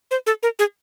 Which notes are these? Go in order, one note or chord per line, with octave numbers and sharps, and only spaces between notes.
C5
A4
A#4
G#4